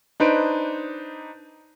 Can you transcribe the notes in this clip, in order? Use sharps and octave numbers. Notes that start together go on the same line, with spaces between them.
D4 D#4 B4 C5 D7